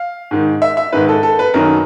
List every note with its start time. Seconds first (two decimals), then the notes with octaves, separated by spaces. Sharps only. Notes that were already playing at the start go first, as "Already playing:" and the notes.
Already playing: F5
0.31 G#2 D#3
0.62 E5
0.77 E5
0.93 G#2 D#3 B4
1.09 A4
1.23 A4
1.39 B4
1.54 F#2 D#3 A#4